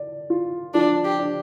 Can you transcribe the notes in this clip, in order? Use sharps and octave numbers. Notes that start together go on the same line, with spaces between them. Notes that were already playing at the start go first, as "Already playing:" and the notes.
Already playing: D5
F4
F3 D4
G4
D4